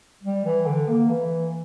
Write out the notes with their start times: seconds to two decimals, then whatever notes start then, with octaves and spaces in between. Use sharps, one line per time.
0.23 G3
0.45 E3
0.66 D3
0.88 A#3
1.10 E3